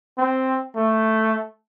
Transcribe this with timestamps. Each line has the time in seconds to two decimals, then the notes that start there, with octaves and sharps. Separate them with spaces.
0.18 C4
0.76 A3